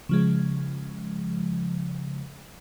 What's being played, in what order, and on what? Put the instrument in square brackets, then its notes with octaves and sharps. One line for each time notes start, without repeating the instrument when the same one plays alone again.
[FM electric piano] C#3 F3 G#3